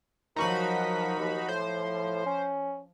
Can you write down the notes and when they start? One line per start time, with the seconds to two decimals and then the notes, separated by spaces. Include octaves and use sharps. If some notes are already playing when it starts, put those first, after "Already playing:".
0.36 F3 F#3 D#4 F#4 A#4 B5
1.20 D#2 F3
1.48 A2 C5
2.26 C#4